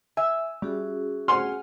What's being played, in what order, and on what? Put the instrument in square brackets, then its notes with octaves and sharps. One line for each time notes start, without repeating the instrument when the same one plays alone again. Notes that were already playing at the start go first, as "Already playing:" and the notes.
[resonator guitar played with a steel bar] E5 [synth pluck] G#5
[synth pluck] G3 [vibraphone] C#4 F#4 G#4
[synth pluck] F#5 G#5 F6 [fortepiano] C6